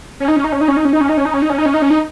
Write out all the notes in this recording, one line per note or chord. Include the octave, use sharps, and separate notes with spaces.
C#4
D#4
C#4
D#4
C#4
D#4
C#4
D#4
C#4
D#4
C#4
D#4
C#4
D#4
C#4
D#4
C#4
D#4
C#4
D#4
C#4
D#4